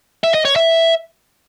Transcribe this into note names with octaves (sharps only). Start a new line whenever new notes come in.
E5
D#5
C#5
E5